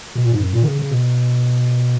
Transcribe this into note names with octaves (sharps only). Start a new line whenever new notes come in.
B2
A#2
G#2
F#2
A#2
D#3
C#3
C#3
B2